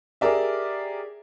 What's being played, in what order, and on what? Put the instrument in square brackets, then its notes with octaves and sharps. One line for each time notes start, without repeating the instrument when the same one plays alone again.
[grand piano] G4 G#4 A#4 D5 E5